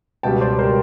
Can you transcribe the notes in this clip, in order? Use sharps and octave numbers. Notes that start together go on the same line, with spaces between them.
C#2 B2 G3 G5 A5
C5 D5
B2 G3 A#4 C5